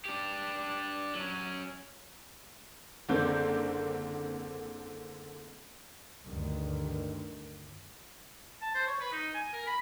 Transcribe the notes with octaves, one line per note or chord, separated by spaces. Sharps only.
D4 G4
F#3 C#4
F#1 D3 A#3 C4 G6
D2 G2 D3 D#3
A5
C5
C#5
B4
D#4
G#5
A#4
B5